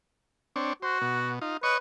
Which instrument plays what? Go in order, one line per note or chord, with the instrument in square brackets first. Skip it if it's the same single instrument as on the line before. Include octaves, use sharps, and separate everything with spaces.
[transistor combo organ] C4 D4 C#5
[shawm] F#4 [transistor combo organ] C5
[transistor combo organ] B2
D#4 F4
[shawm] B4 [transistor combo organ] C#5 D#5 C#6